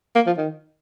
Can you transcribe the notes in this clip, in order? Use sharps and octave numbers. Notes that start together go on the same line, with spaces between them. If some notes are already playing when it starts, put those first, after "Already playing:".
A#3
F3
D#3